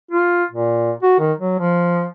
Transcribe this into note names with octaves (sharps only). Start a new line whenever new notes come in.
F4
A#2
F#4
D#3
F#3
F3